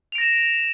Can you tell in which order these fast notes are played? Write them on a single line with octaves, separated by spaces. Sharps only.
F7 D7 A#6 E7